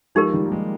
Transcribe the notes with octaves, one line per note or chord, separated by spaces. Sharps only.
F3 G#3 D#4 G4 A#4
D#3 G3
A#3
F3 G#3